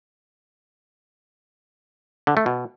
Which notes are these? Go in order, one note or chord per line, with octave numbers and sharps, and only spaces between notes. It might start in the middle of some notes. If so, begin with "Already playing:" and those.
D3
A3
B2